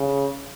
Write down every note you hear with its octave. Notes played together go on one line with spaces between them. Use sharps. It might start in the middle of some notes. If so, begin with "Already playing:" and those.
Already playing: C#3